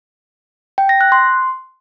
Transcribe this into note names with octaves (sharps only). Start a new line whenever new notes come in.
G5
A#6
F#6
C6